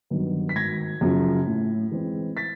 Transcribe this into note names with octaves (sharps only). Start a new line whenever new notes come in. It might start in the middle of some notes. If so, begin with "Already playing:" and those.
G2 D#3 F#3 B3
B6
G#1 G#6 A#6
F#2 C#3 F3
A2
E3 G#3 C4
A6 B6